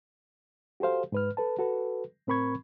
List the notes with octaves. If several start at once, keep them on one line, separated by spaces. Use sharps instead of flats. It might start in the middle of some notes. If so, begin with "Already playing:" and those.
F#4 G4 A4 C5 F5
G#2 B4 F6
A4 B4 A5
F#4 A4 B4
A2 C4 A#4 B5 C#6 G#6